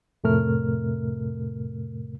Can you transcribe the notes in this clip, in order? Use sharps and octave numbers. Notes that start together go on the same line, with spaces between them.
F2 A2 C3 A3 A#4 F6